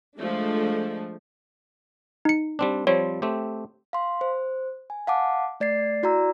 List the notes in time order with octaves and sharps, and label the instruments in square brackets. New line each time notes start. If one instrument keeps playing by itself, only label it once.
[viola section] F3 G#3 A3 D4
[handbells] D#4 C#7
[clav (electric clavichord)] G3 C4 D4
[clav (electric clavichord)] F3 G3 C4 [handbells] C#5
[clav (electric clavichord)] A3 C4 G4
[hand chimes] F5 C6
C5
G#5
F5 F#5 A5 D6
A3 D5 A6 C7
E4 F#4 D5 A#5 E6